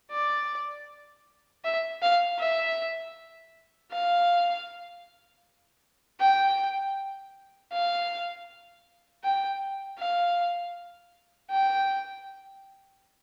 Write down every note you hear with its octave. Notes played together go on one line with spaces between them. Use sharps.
D5
E5
F5
E5
F5
G5
F5
G5
F5
G5